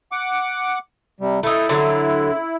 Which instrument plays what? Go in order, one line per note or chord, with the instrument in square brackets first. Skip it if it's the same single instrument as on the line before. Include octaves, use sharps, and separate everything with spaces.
[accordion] F#5 D6
C3 G3
[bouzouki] A3 D#4 [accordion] E4
[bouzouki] D3 F#3